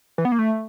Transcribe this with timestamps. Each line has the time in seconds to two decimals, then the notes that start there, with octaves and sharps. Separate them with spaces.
0.18 E3
0.25 B3
0.32 A#3
0.39 A3